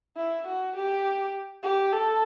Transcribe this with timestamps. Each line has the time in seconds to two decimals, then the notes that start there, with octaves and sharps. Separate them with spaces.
0.17 E4
0.47 F#4
0.76 G4
1.63 G4
1.93 A4